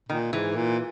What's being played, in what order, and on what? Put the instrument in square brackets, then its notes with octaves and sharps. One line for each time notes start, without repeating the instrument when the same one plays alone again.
[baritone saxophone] A#2 [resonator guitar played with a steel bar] D#3
[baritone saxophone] G#2 [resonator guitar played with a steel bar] E3
[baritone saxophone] A#2